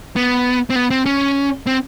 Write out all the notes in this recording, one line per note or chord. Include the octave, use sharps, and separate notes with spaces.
B3
C4
B3
C4
C#4
C4